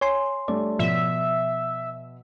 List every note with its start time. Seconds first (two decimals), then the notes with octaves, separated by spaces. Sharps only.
0.01 C#5 G#5 C6
0.48 G3 A3 D4 D5
0.79 B2 F3 E5